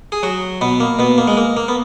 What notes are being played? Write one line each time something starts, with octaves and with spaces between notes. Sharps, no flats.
G#4
F#3 F#4
B2 B3
A#3
B2 B3
A#3
G#3
A#3
A#3
B3